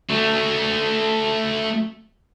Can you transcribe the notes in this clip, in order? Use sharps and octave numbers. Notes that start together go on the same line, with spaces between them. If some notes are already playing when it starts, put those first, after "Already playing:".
A3 F#4